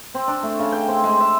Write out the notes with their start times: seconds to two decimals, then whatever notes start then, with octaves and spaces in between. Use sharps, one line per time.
0.15 C4
0.28 D4
0.43 A3
0.59 C#3
0.72 G5
0.88 C4
1.04 G#3
1.20 E5